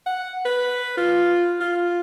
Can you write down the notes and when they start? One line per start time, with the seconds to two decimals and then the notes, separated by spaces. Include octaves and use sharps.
0.06 F#5
0.45 B4
0.97 F4
1.60 F4